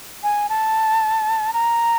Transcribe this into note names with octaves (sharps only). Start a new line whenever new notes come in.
G#5
A5
A#5